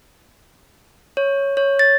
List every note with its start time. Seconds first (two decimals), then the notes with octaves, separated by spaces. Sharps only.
1.17 C#5
1.57 C#5
1.79 A6